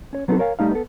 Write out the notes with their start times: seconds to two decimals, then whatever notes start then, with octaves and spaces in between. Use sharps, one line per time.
0.13 C#4 C#5
0.28 F#3 B3 C4 D4 D#4 A4
0.39 A#4 C#5 F5 G#5
0.59 G3 A3 D#4 F5
0.71 B3 A4